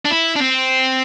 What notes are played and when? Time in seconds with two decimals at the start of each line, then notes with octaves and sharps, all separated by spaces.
0.05 D4
0.11 E4
0.36 D4
0.41 C4